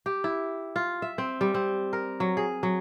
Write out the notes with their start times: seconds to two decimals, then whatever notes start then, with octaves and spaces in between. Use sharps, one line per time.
0.06 G4
0.24 E4
0.76 F4
1.02 E5
1.18 C4
1.41 G3
1.54 C4
1.93 A#4
2.20 F#3
2.37 G#4
2.63 F#3